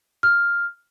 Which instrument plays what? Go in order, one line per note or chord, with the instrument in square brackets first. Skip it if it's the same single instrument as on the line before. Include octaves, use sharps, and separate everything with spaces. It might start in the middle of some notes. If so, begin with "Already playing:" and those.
[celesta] F6